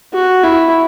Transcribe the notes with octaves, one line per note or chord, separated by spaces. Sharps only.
F#4
E4